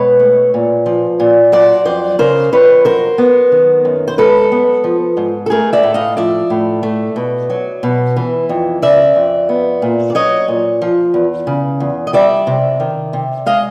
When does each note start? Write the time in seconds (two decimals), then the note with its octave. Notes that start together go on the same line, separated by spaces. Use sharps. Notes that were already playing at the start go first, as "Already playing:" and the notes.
Already playing: B2 G#3 B4 C#5
0.20 A3
0.54 A#2
0.86 F3
1.20 A#2
1.52 F#3 C5 D5
1.85 F2 C5 D5
2.19 C#3 A#4 C5
2.52 F2 B4 C#5
2.85 F#3 A#4 C5
3.18 B3
3.52 D#3
3.85 F#2
4.07 C5
4.18 G#3 A4 B4
4.52 B3
4.84 F3
5.17 G#2
5.46 A4
5.50 A3 G#4 A#4
5.73 D5 E5
5.83 A2
5.94 D#5 F5
6.17 F3 D5 E5
6.50 A2
6.83 A3
7.16 B2
7.50 F#3
7.83 B2
8.16 E3
8.49 F2
8.82 C#3 D5 E5
9.16 F2
9.49 B3
9.82 A#2
10.10 D5
10.15 F#3 C#5 D#5
10.48 A#2
10.82 F3
11.14 E2
11.47 C#3
11.80 E2
12.07 D#5
12.13 G3 D5 E5
12.47 C3
12.80 D#3
13.13 C3
13.46 G#3 D#5 F5